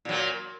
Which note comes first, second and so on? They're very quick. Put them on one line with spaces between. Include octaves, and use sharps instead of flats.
A#2 F#3 A#3